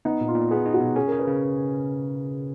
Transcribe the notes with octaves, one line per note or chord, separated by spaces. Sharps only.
B3 D#4
A#2
F4
A#2
B3 G#4
D#4
F#4
B2
C#4 G#4
G#4 A#4
B4
C#3